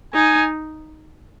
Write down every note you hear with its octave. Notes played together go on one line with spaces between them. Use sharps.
D#4 G#5